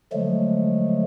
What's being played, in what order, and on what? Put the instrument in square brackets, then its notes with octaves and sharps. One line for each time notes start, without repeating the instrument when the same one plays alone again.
[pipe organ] D3 F3 F#3 G#3 A3